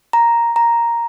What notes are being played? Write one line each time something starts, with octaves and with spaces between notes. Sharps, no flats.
A#5
A#5